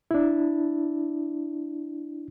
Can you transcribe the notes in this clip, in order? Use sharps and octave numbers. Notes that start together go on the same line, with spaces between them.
D4 E4